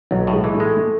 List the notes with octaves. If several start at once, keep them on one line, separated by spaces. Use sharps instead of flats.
B1 F#3
A2
G#3
E3
A3
G#3
A3